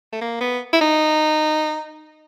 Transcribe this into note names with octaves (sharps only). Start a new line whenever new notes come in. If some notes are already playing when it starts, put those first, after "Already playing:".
A3
A#3
B3
E4
D#4